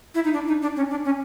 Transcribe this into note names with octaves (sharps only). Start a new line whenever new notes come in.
E4
D#4
D4
D#4
D4
C#4
D4
C#4